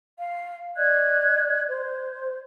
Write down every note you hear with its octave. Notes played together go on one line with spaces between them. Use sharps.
F5
D5 D#5 F#6 G#6
C5